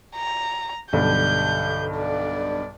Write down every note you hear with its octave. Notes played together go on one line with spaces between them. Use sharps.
A#5
B1 G2 D3 G6
D5